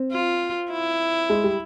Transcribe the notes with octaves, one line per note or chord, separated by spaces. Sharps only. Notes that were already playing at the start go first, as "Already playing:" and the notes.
Already playing: C4
F4
E4
G#3
G3